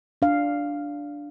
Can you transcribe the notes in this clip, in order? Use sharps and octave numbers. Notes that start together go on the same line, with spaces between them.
D4 F5